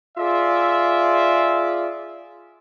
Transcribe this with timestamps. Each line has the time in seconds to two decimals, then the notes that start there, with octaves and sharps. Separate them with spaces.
0.18 F4 G#4 D5 E5